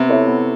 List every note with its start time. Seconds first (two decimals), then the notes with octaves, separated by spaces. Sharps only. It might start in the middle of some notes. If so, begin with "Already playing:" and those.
Already playing: C3 B3
0.08 E4 A4 C#5 E5
0.27 B3